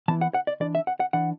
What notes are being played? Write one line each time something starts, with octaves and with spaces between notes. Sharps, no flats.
E3 B3 E4 A5
F#5
F#5
D5
E3 D4 D5
E5
F#5
F#5
E3 D4 F#5